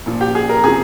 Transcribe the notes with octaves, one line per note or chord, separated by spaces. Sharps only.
A#2 F3
G4
G#4
A#4
C3 F3 G#4